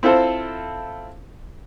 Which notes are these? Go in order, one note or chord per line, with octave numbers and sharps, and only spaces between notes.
C4 E4 F4 A4 C5